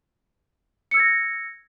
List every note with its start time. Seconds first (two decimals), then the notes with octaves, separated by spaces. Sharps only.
0.91 C#7
0.94 E6
0.97 G#6
1.00 A#6